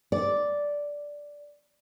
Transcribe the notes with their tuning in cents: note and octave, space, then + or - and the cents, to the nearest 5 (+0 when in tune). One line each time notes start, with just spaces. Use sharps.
D5 -5